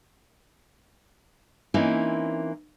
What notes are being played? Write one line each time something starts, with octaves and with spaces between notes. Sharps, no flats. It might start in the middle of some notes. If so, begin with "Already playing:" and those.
E3 A#3 C4 C#4 D#4 E4